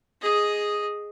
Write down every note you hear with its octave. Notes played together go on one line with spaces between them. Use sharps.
G#4 D#5